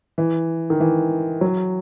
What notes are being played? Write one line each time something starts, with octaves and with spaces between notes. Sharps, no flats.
E3
D#3
E3
F#3